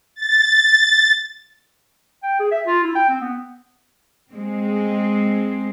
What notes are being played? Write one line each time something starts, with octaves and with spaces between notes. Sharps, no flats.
A6
G5
G#4
E5
F4
E4
G5
C4
B3
G#3 C4